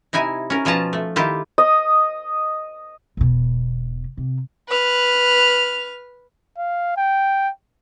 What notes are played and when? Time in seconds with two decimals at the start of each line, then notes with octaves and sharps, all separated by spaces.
0.13 C3 D#4 E4 G#5
0.50 C#4 A#4
0.65 B2 F3 C#4 F4 A5 A#5
0.93 A3
1.16 D#3 E4 F4 G4
1.58 D#5
3.17 E1 B2
4.17 C3
4.68 B4 F6
6.58 F5
6.97 G5